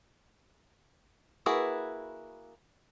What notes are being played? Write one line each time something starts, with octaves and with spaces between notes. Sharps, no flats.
A#3 E4 F#4 G#4 B4